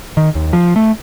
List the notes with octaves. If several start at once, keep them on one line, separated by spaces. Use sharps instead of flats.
D#3
D#2
F3
A3